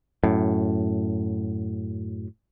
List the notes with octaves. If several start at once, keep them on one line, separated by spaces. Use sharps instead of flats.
F#2 A2